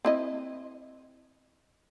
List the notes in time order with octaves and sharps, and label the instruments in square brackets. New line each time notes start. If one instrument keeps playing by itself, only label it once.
[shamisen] C4 E4 D#5